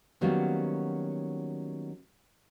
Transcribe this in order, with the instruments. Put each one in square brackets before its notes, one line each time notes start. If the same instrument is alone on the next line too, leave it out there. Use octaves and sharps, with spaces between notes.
[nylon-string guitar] D#3 F#3 G3 A#3 B3 C#4